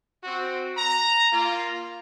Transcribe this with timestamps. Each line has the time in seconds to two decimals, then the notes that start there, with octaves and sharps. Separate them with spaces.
0.24 C4 F#4
0.78 A#5
1.32 A#3 F4